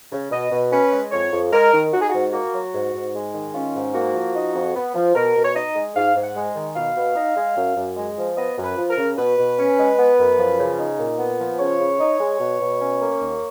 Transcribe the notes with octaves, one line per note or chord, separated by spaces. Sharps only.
C#3
B2 D#5
B2
C#4 B4
G#3
F2 C#5
F2
G#3 A#4
D#3
D#4 F#4
G#4
G#2 F#4
A#3 F#4
F#3
G#2
G#2
G#3
D#3
C#4 F4
G#2
A#3 F#4
F3
D#4
F2
B3
F3
B2 A#4
B2
C#5
D#4 D#5
G#3
G#2 F5
G#2
F#5
G#3
D#3
B2 F5
B2
D#4
G#3
F#2
F#2
G#3
F3
B3 D#5
F#2
B4
F3
A#4
C#3
B2 B4
B2
C#4
G#3
B3
F#2
F3
C#3
D#4
A#2
B3
F3
C#3 C#5
C#3
D#4
G#3
B2
B2
C#4
A#3
D#2